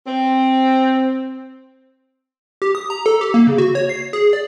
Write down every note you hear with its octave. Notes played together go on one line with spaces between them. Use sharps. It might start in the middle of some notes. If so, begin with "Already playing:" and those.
C4
G4
D#6
A#5
A4
G4
A#3
C#3
F#4
C#5
C7
G#4
D5